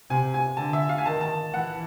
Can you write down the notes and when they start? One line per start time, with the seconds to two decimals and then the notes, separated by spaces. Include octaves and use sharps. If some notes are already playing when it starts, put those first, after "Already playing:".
0.10 C3 G#5
0.34 G#5
0.57 D3 A5
0.73 E5
0.89 F5
0.98 G#5
1.06 D#3 A5
1.21 A5
1.52 E3 F#5